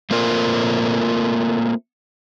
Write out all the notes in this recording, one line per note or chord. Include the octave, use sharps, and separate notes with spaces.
A3 A#3 C4 F4 A#4